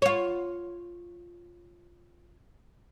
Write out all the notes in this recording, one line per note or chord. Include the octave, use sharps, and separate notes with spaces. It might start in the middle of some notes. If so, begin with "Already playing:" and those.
F4 C#5